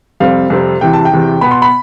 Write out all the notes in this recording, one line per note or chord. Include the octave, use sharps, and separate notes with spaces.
F2 C3 G3 C4 F5
F2 C3 G3 C4
E2 C3 E3 G5
A5
G5
E2 C3 E3
B2 B3 B5
C6
B5